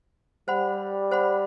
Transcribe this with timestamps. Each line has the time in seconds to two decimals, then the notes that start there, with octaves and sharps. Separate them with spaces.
0.48 G3 C5 F#5 B5
1.11 C5 F#5 B5